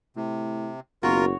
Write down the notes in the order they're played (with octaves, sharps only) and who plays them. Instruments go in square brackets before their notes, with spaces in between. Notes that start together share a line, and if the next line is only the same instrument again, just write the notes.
[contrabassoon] A2 [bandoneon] C3
[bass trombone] F#1 [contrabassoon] B2 [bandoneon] F4 A#4 [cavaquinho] F#4 C#5